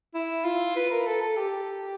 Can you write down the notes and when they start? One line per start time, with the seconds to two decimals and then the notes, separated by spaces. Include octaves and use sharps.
0.15 E4
0.45 F4
0.76 B4
0.91 A#4
1.07 A4
1.21 A4
1.37 G4